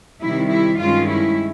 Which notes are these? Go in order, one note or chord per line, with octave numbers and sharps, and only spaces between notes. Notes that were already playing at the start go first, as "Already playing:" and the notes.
C3 D#3 G3 E4
E4
G2 D#3 G#3 C#4 F4
E4